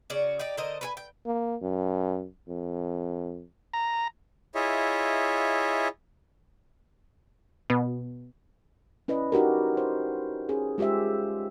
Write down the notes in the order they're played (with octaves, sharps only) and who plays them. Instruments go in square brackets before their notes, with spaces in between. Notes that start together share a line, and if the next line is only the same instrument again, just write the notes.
[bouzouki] C#3 C#4 F#4 D5
D#4 G4 D5
D3 A#4 C5 D#5
B4 C5 G#5
G5
[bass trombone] A#3
F#2
F2
[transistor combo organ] A#5
[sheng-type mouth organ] E4 F4 G#4 C#5 D#5 E5
[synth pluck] B2
[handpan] C#4 E4 B4 D5 D#5
D#4 F#4 G4 A#4
C5
C#4 G#4
G#3 F4 G4 C5 E5